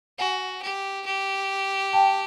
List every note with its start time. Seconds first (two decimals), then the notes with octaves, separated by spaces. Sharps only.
0.18 F#4 F#5 G#5
0.62 G4
1.06 G4
1.93 G5 A5